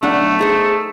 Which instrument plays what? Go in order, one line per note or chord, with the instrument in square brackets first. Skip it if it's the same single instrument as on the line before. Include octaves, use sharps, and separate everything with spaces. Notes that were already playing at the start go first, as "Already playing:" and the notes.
[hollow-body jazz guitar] B1 D4 F#5 [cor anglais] A3
[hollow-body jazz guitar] D#4 G#4 C5